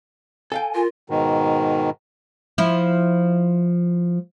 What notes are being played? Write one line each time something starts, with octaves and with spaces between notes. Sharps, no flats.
A4 F5 G5 G#5
F4 A#4
G#2 B2 D#3
F3 E4